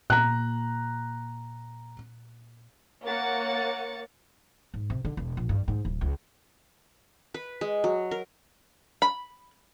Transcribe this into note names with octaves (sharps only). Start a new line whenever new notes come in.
A#2 A#5 F#6
A#3 C#5 F#5 A6 C#7
G#2
C3
D3
E1
A#1
G2
G#2
D1
C#2
B4
G#3
F#3
A#4
B5